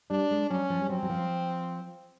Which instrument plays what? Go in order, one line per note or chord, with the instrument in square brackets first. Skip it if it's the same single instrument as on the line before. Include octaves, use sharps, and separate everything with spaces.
[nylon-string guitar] G3 [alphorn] D4
[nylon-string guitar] G#3
[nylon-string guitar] F#3 [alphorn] C#4
[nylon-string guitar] F3
G3
[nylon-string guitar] F#3 [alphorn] C4
[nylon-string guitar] F#3
F3